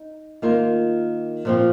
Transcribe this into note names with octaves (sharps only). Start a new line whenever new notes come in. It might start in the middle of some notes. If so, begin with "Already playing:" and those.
Already playing: D#4
D#3 A#3 F4
A#2 F3 C4